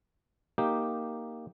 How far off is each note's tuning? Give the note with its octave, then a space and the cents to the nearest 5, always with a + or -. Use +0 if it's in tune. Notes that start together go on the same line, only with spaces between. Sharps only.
A#3 +0 D#4 +0 G4 +0